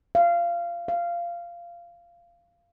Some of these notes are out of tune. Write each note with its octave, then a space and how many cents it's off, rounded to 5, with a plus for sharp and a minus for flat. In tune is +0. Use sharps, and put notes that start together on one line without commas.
F5 -20
F5 -15